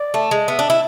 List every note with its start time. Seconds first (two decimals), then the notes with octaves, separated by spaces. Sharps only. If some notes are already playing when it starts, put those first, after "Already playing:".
Already playing: D5
0.14 A3
0.31 G#3
0.47 B3 E5
0.59 D4
0.70 E4